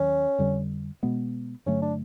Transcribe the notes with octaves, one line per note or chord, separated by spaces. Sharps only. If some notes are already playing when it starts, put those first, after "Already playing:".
Already playing: D#2 D#3 F#3 C#4
F2 D3 G3
B2 G#3 B3
G2 D3 F#3 A3 C#4
D4